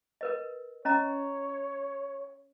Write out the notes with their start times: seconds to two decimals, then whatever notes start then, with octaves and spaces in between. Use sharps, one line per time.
0.21 A#4 B4 D#5
0.85 C#4 C#5 D#5 A#5